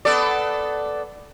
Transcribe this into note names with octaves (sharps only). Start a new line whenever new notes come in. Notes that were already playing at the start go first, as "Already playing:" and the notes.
B3 A4 D5